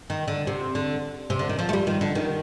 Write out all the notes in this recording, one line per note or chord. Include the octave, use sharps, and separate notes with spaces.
D#3
D3
C3
D3
C3
D3
D#3
F3
A3
G3
D#3
D3
D#3